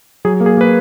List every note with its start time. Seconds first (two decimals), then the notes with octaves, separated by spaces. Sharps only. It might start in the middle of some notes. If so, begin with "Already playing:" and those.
0.25 F#3 G#4
0.41 A#3
0.46 G#4
0.57 A#3 B4